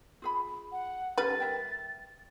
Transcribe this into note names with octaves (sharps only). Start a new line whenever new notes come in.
F4 G#4 B5
F#5
G3 C#4 D#4 A4 B4 A6
A#4 E5 G5